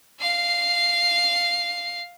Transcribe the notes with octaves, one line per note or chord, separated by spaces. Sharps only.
F5 C7